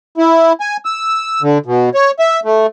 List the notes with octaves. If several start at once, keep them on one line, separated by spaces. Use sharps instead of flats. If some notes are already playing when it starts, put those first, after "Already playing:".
E4
G#5
E6
D3
B2
C#5
E5
A3